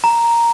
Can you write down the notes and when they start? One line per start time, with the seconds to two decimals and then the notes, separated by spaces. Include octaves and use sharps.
0.04 A#5